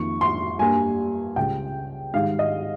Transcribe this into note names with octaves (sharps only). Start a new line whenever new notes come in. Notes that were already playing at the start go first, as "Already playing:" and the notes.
Already playing: F2 D#3 A#3 C#6
C6
G2 G3 A#3 G#5
C#2 C#3 G3 G5
G#2 D#3 G3 F5
D#5